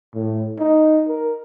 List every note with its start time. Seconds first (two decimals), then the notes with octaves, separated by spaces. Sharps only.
0.14 A2
0.59 D#4
1.08 A#4